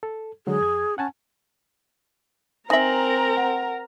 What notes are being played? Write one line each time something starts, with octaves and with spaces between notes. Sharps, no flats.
A4
D3 F#3 G#3 G#4
F2 G#6
C#4 F#5 G#5 A5
C4 D#4 A#4 E5 G#5 A#5 A#6 F#7
F#5